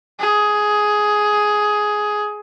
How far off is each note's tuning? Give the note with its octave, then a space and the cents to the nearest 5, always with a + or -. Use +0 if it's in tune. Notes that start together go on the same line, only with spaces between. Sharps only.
G#4 +10